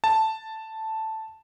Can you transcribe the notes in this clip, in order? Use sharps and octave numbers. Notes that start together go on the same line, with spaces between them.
A5